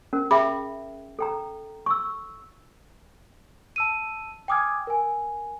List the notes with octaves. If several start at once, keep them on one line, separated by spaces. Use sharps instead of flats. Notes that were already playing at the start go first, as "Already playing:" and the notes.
C#4 A#4
G#4 E5 G5 B5
A4 G5 A#5
C#6 E6
A5 E6 D#7
G5 G#5 D6 D#6 F6 G#6
A#4 G#5